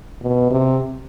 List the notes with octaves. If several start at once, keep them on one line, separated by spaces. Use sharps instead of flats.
B2
C3